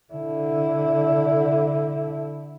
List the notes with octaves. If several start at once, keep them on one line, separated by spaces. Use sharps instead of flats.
D3 E4